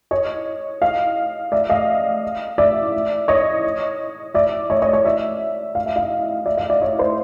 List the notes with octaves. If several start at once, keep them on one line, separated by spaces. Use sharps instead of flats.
C#5 D#5
D#5 F5
D5 E5
D#5 F5
D5 E5
C#5 D#5
D5 E5
C#5 D#5
C#5 D#5
C#5 D#5
D5 E5
F5
E5
D#5 F5
D5 E5
D#5 F5
D5 E5
C#5 D#5
C5 D5